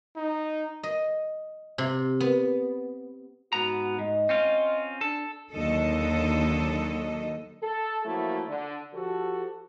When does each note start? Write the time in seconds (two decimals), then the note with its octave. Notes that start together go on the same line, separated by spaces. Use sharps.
0.16 D#4
0.83 D#5
1.78 C3
2.20 B3
3.53 G#2 B3 F#4 A#5
3.99 G#2 D#5
4.29 C4 C#4 F4
5.01 D4 A4
5.52 D#2 D3 F#3 A4 D#5
7.63 A4
8.05 F3 F#3 A3 A#3 E4 F#4
8.48 D3
8.94 F3 F#4 G4 A4